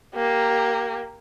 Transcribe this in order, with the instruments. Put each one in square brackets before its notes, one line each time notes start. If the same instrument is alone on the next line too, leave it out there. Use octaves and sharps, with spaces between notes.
[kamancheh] A#3 G4